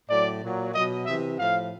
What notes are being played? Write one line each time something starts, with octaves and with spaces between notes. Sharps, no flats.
A2 F#3 D5
A#2 F#3
B2 F#3 D#5
C3 E3 E5
A2 F3 F5